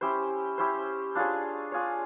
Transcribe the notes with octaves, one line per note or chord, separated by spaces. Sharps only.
C#4 E4 G4 C5
C#4 E4 G4 C5
D4 F4 G#4 C#5
D4 F4 G#4 C#5